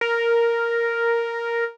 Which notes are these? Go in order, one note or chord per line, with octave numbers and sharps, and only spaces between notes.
A#4